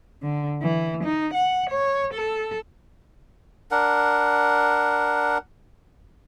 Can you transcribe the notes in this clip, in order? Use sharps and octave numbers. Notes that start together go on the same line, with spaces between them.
D3
E3
D#4
F#5
C#5
A4
D4 A#4 F#5